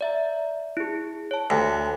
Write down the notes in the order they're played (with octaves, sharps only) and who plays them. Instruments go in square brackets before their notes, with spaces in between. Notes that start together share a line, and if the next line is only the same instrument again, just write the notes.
[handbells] D5 E5 A#5
E4 G#4
C#5 A5
[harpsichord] D2 [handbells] G#5 B5